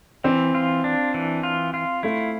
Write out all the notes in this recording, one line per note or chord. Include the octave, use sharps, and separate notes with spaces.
E3 C4
F4
D4
E3
F4
F4
A3 E4